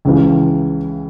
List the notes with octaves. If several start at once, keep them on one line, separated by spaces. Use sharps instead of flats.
C#2 C#3 E3